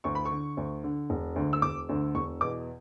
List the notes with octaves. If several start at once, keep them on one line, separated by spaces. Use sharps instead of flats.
D2 C#6
B5
C#6
D3
D2
D3
E1
D2 D3
E6
E1 D6
D2 D3
E1 C#6
E2 B2 D6